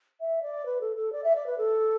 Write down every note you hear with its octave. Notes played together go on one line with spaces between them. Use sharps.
E5
D5
B4
A4
A4
D5
E5
D5
B4
A4